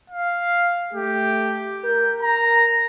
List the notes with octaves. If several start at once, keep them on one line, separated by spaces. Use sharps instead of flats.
F5
A3 G4
A#4 G6
A#5